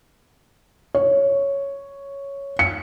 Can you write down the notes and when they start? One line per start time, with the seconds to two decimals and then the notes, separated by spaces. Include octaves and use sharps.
0.95 C#5
2.59 C#7